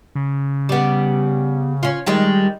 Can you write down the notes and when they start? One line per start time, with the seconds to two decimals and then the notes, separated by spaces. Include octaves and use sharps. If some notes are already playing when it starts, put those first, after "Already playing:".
0.15 C#3
0.69 G3 B3
1.83 C#4 F4
2.06 D#3 G3 G#3